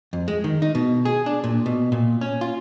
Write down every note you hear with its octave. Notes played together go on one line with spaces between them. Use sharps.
F2
G#3
D#3
D#4
B2
G#4
D4
A#2
B2
A#2
C#4
F4